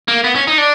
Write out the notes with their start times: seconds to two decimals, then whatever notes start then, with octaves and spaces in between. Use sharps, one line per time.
0.08 A#3
0.24 B3
0.35 C#4
0.47 D#4
0.58 D4